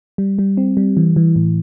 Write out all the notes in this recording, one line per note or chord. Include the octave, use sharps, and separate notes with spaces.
G3
G3
C4
G3
E3
E3
A2